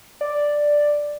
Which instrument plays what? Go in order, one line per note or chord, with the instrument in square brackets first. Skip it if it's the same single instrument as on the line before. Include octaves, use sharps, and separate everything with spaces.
[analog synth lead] D5